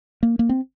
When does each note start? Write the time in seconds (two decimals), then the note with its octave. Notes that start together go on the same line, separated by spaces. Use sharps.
0.23 A#3
0.39 A#3
0.49 C4